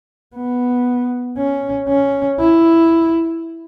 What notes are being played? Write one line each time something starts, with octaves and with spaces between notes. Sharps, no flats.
B3
C#4
C#4
E4